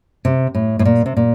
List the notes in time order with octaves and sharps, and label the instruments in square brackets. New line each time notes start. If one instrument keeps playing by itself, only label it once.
[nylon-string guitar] C3
A2
A2
A#2
C3
A#2